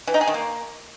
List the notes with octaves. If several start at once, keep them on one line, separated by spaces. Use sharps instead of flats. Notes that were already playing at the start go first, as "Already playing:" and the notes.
E3
D#4
G#4
D#3
A#3